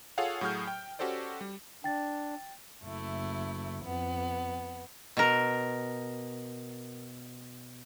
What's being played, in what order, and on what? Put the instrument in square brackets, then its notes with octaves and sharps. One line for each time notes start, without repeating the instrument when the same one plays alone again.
[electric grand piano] F4 G#4 A4 C#5 F5 F#5
A2 F#3 F#4 G#4 F6 G6
G5
C#4 F#4 G4 A4 C5 D5
G3
[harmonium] D4 [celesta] G5 A6
[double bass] F#1 [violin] A3 E4
[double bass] F2 [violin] B3
[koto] B2 A#4